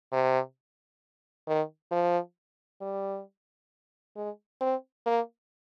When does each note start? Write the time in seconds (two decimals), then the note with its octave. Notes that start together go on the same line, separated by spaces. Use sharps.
0.12 C3
1.48 D#3
1.91 F3
2.81 G3
4.16 G#3
4.61 C4
5.06 A#3